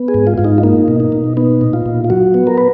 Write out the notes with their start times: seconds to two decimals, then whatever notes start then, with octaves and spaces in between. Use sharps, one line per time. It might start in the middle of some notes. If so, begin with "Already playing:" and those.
Already playing: B3
0.08 G#4
0.14 G#2
0.27 F4
0.38 G#2 F4
0.45 D#4
0.58 F4
0.63 A#3 D#4
0.88 B2
1.00 D#4
1.12 B2
1.37 B3 D#4
1.61 A#2
1.73 F4
1.86 A#2
2.04 F4
2.10 F#3 F#4
2.34 B3
2.47 A#4
2.58 B4